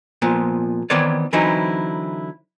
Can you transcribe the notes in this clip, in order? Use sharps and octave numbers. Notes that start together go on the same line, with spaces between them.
A#2 F3 B3
D#3 E3 B3 C4 C#5 D5
D3 E3 F#3 C4 D#4 E4